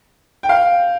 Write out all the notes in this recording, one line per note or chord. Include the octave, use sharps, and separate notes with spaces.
G5
F5